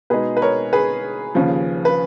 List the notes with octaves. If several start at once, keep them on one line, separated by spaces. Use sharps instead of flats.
B2 G#3 D#4 G#4 B4
B4
A#4 C#5
G#4 B4
D#2 C#3 F3
B4